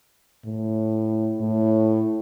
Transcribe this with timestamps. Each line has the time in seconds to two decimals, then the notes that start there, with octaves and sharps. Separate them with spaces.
0.46 A2
1.41 A2